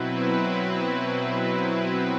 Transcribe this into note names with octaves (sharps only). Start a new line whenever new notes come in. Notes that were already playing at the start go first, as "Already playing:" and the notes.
Already playing: B2 F#3 C4 E4 B4